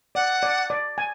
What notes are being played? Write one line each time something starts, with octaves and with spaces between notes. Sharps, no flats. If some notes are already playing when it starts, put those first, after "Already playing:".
D5 F#5
D5
D5
G#5